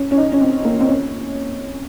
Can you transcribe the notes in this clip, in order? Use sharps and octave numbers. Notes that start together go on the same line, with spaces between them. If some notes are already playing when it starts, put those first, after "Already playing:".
Already playing: C#4
C#4
D#4
C#4
C4
A#3
C4
C#4